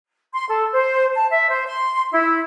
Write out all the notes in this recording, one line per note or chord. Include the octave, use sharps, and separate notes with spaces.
C6
A4
C5
A5
E5
C5
C6
E4